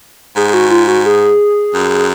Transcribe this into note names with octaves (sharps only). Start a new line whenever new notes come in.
G#2 G#4
G#4
F#4
F4
F#4
G#4
F#2